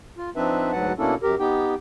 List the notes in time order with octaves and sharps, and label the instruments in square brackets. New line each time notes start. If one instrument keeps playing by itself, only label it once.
[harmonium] F4
F3 C4 D4 D#4 B4 E5
D2 G#2 F#3 B4 F#5 A5
B2 A#3 C#4 D4 E4 A4
F#2 G4 A#4
B3 D#4 G4 G5